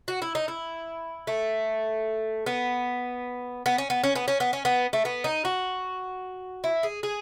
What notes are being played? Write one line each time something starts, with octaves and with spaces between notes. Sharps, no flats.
F#4
E4
D#4
E4
A3
B3
B3
C#4
B3
C#4
B3
C#4
B3
C#4
B3
A3
B3
D#4
F#4
E4
G#4
G#4